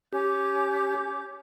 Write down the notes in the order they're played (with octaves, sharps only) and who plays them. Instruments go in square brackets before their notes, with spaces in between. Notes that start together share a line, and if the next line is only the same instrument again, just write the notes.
[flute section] C#4 D6 G6 [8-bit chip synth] G4